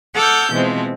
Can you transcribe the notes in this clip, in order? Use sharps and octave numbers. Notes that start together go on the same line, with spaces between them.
A4 F#5 D6 E6 F6 G6
B2 E3 F3 G#3 C4